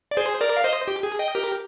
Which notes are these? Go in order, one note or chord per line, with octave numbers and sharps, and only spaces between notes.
D5
G#4 C5
A#4 D5
F5
C5 D#5
G4
G#4
D#5 G5
G4 A#4